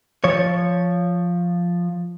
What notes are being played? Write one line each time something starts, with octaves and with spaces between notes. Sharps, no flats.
F3 C#5